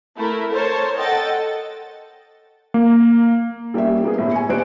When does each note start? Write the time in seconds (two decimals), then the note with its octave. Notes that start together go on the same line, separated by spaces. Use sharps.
0.16 A3 E4 A#4
0.52 A#4 C5 C#5 A5
0.97 A4 D#5 F#5 G5 A6
2.74 A#3
3.74 G3 A#3 C#4 G4 E5
4.04 A#3 B3 G#4
4.18 G1 A2
4.31 G#5 C#7
4.49 D#1 A1 D#2 C5 F#6 D7